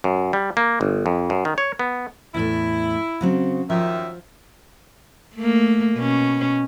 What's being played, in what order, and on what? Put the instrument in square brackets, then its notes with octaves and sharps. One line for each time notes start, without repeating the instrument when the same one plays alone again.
[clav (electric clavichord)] F#2
G3
A#3
G1
F2
F#2
D#3
C#5
B3
[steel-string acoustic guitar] E2 A2 A4 [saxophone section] E4
[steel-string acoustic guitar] C#3 F#3 C4
[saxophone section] F#2 D#3 E5 [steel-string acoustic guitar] F3
[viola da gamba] A3 A#3
B2 C#4